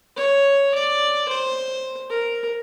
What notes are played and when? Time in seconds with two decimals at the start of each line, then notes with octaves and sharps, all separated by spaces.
0.16 C#5
0.74 D5
1.28 C5
2.10 A#4